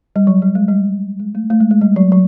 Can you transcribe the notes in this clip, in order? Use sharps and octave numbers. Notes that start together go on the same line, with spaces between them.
G3
F#3
G3
G#3
G3
G#3
A3
A3
G#3
G#3
G3
F#3
F#3